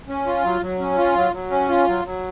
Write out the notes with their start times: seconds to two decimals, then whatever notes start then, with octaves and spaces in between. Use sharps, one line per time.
0.08 C#4
0.27 F4
0.44 F#3
0.62 F#3
0.80 C#4
0.97 F4
1.15 F#3
1.33 F#3
1.51 C#4
1.69 F4
1.87 F#3
2.05 F#3